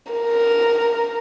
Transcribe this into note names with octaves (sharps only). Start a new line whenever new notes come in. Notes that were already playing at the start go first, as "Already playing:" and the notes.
A#4